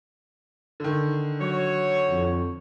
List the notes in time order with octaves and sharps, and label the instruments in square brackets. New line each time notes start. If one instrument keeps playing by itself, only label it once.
[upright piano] D3 D#3
[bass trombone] F#3 [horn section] F#4 C#5
[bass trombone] F2